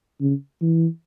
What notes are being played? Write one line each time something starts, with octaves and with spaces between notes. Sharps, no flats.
C#3
E3